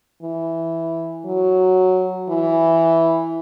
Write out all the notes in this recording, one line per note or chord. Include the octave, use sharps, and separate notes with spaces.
E3
F#3
E3